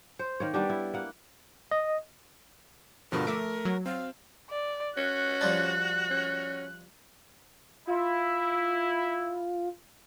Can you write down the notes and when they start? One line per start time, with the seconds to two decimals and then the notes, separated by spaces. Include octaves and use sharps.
0.19 C5
0.40 D#3 A#3 C#5
0.54 G3 B3 D4 G4
0.70 E4
0.94 A#3 F#5
1.71 D#5
3.12 G2 B2 D3 F3 A#4
3.27 A3 E5 D6
3.65 F#3
3.86 C4 F5
4.50 D5
4.97 C#4 F#4 F#6
5.41 F3 G3 D4
6.10 C#4
7.87 E4 F4